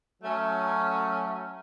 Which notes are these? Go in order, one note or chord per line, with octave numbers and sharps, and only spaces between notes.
F#3 A3 C#4